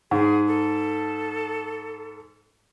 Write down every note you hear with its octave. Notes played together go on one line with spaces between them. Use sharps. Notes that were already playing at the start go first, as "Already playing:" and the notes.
G#2 G#4
A4